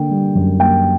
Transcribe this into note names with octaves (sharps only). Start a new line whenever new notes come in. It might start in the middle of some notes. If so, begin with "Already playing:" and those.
Already playing: D3 A#3 G5
G3
F#2
A#3 G5